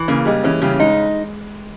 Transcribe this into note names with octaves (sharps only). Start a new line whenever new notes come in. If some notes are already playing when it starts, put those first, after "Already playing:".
Already playing: E3
C#3 A#3
G3 G#3
E3 C#4
C#3 G3
G#3 D#4